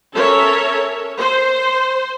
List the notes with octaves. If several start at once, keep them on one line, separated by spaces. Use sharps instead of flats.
C#4 A4 A#4 C#5 E5
C5